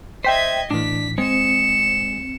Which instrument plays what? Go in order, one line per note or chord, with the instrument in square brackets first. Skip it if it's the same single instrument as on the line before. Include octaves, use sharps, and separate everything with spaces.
[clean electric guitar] C5 E5 [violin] D#5 G#6 [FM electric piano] G5 B6
[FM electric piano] A2 E3 [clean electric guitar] D4 [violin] B6
[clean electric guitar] G#3 [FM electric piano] C4 [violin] C#7 E7